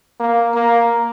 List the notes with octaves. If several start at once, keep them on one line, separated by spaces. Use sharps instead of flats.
A#3
A#3